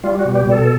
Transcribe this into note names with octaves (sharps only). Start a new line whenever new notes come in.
G3 F4
F#4
B2
G4
B2
A4